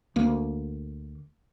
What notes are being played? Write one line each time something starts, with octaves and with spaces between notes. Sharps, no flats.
D2 A#3